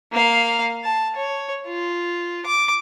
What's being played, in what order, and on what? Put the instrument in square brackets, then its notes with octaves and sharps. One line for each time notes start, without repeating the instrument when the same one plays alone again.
[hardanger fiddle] A#3 F5
A5
C#5
F4
D6